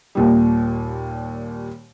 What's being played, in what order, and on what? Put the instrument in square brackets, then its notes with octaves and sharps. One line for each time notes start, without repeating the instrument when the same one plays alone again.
[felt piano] D#2 A#2 G3